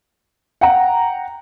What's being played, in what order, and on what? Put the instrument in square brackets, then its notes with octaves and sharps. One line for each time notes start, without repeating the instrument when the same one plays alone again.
[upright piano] F#5 G5 A#5